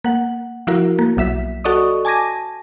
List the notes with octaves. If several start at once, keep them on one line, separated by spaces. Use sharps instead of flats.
A#3 F#5
F3 E4 F#4 A#4
A#3
B1 F#3 E5 B6
F#4 A4 D5 D#5 C#6 D#6
G#5 A5 D6 G#6 A#6 D#7